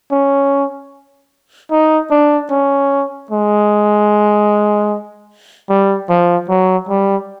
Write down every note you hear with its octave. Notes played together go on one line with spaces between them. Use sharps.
C#4
D#4
D4
C#4
G#3
G3
F3
F#3
G3